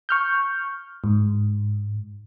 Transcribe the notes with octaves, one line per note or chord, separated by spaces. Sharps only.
C#6 F6 G6
G#2